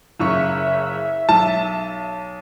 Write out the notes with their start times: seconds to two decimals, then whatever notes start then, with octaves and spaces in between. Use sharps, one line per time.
0.19 F#1 C#3 E5 C#6
1.29 B1 A5